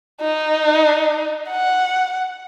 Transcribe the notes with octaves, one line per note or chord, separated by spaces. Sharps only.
D#4
F#5